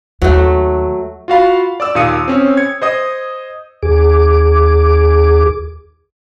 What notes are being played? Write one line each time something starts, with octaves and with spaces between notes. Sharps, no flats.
D#2 F#3 A3
F4 F#4 F5 B5
D5 D6 E6
D#2 A#2 F5 D#6 C#7 D#7
C4 C#4
G#6 C#7
C5 D#5 D#6
D#2 G#4 D6